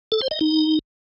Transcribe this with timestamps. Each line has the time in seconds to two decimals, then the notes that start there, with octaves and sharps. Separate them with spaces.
0.12 A4
0.21 C5
0.31 D#5
0.41 D#4